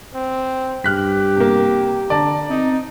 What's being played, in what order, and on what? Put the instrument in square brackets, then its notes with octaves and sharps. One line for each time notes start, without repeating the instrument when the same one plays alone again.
[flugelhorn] C4
[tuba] G2 [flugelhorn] G4 [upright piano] F6 F#6 B6
[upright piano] C3 A#3
[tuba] D3 [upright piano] D5 A5 A#5
[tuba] C4 [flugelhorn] D#4